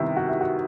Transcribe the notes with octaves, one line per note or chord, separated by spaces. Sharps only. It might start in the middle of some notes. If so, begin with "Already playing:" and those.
Already playing: C3 D#3 G3 B3 D#4 E4
F#4
E4
F#4